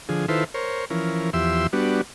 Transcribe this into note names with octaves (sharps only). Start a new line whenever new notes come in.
D3 F3 G#4
D#3 E4 F4 A4 B4 C5
A#4 C5 C#5
E3 F3 C#4 A#4
E2 F3 G4 E5 C6 E6
G3 B3 D4 F#4